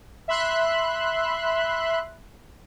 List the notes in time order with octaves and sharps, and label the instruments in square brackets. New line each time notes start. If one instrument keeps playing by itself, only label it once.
[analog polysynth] E5 B5 C6 F#6